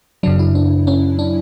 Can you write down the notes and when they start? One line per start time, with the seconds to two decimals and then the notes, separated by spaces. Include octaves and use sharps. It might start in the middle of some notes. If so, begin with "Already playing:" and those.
0.23 F#2 C#3 F#3 D4
0.39 E4
0.55 D4
0.87 C#4
1.19 D4